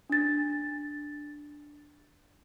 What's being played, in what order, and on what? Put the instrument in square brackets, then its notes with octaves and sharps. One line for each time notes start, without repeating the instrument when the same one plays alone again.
[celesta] D4 A6